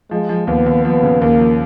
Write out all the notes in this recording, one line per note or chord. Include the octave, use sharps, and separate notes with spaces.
F3 G#3
F3
D#2 B3
D#2
F3 B3
C#3
D#2 A#3
F3